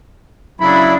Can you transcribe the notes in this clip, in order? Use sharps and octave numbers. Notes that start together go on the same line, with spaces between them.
C#3 F#3 D4 E4 B5